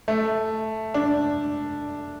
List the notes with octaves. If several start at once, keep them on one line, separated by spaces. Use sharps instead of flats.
A3
D4